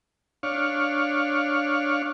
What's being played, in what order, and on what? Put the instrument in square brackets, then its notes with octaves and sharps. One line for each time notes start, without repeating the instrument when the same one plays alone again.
[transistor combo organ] D4 C#5 F5